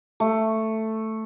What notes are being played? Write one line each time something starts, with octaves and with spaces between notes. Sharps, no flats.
A3